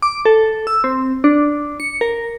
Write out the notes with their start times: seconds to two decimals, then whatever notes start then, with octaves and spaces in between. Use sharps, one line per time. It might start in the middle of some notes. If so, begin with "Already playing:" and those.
0.02 D6
0.25 A4
0.67 E6
0.84 C4
1.24 D4
1.80 C#7
2.01 A#4